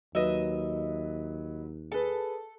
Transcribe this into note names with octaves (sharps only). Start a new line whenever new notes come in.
D#2 F#3 B4 D#5 E5
G#4 A4 B4